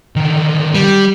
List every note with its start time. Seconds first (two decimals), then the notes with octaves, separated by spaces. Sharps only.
0.16 D3 D#3
0.75 G3